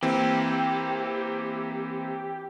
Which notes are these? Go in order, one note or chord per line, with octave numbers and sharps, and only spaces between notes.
E3 A#3 C4 G4